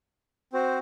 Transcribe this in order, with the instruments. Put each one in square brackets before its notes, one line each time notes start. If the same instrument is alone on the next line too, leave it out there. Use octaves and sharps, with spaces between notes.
[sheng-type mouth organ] C4 F#4 C5